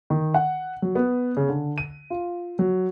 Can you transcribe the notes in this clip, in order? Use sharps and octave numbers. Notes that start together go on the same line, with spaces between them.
D#3
F#5
F#3
B3
C#3
D3
D#7
F4
F#3